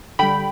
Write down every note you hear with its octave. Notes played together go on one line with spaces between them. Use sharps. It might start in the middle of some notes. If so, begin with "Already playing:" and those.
D3 G3 G5 B5